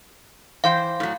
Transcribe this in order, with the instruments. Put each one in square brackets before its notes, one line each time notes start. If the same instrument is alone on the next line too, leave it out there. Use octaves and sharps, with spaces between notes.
[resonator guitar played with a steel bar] E3 C5 G5 [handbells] F5
[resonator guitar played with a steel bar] A2 F#3